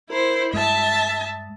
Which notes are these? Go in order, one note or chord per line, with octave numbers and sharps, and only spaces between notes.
E4 A#4 C5
G2 G#3 E5 A5